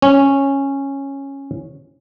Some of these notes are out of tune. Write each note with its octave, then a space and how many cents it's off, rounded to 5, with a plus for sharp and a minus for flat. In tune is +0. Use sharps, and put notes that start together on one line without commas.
C#4 -10